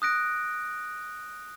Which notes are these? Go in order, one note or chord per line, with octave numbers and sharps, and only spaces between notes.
D#6 F#6 A#6 D7